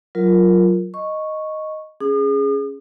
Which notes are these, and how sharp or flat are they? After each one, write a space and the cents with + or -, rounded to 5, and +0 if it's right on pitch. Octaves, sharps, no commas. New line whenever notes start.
F#3 +0 F4 +0 A#4 +0
D#5 +0 C#6 -5
C#4 +0 G#4 +0 D#6 -45